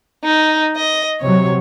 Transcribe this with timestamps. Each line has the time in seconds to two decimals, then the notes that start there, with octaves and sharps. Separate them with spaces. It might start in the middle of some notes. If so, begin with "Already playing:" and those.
0.24 D#4
0.77 D#5
1.21 C3 F#3 C#5